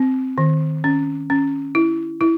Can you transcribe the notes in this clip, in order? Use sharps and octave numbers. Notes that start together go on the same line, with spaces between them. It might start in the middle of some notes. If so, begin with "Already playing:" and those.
Already playing: C4
D#3
C#4
C#4
E4
E4